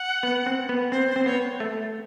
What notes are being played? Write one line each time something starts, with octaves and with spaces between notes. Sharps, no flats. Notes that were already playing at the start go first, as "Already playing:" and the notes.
Already playing: F#5
B3
C4
B3
C4 C5
C5
C4
B3 C#5
A3